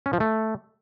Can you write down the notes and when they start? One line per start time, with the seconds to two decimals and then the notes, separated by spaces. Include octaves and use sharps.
0.06 C#4
0.13 F3
0.20 A3